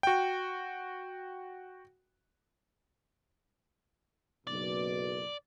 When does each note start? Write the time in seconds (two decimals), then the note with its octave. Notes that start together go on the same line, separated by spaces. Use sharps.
0.03 F#4 G5
4.47 F#1 B1 B2 D5